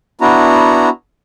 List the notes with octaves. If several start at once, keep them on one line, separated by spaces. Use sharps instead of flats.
B3 D4 E4 F#4 A#5